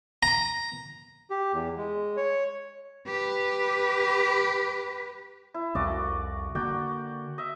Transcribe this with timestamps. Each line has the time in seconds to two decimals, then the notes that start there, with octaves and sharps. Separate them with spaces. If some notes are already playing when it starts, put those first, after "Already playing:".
0.23 A#5
1.30 G4
1.52 E2
1.77 G#3
2.17 C#5
3.07 G4 B4
5.54 E4
5.75 C2 F2 F#4 D5 D#5
6.55 D3 A#3 F#4 D5 G5
7.38 D#5 E5